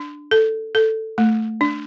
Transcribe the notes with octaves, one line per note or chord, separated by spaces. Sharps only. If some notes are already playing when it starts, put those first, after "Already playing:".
Already playing: D4
A4
A4
A3
D4